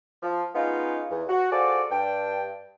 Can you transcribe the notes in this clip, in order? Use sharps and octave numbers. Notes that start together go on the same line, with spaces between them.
F3
G#3 B3 C#4 D#4 F4
E2
F#4
F4 F#4 G#4 A4 C5 D5
G2 D4 G5